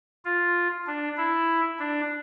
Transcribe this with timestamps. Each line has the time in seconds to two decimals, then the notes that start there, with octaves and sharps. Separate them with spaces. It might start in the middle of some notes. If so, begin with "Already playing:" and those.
0.25 F4
0.87 D4
1.17 E4
1.79 D4